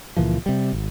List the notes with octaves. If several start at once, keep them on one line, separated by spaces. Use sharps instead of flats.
C#2 A#2 E3 F3
C3 G3
G#1